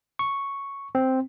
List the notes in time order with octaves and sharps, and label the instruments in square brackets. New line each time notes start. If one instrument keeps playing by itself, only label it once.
[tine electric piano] C#6
C4